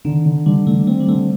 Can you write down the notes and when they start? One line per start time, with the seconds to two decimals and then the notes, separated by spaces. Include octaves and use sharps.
0.05 D3 D#3
0.25 D3
0.46 D3 G3
0.67 D3 A3
0.87 A3 C4
1.00 G3
1.08 D3 A3